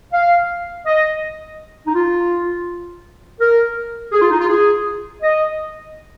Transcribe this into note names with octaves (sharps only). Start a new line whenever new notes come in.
F5
D#5
D#4
F4
A#4
G#4
F4
D#4
F4
G#4
D#5